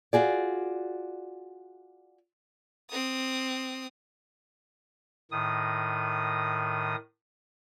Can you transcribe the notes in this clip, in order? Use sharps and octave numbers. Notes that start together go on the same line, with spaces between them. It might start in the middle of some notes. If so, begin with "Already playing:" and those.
F4 F#4 G#4 D5
C4 D#6
A2 D#3 D#6